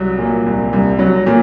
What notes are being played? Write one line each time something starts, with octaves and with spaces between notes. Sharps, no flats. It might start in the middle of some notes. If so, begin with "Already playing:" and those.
Already playing: C2 F#3
A#2
C2
C2
F#3
A#2